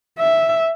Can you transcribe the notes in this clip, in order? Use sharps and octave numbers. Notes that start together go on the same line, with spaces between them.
E5